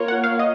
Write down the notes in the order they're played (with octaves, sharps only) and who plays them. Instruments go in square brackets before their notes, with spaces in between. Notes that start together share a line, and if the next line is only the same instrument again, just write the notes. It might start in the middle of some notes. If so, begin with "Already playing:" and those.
Already playing: [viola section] A#3 F4 A#4 C#5
[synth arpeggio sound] F#5
F5
D#5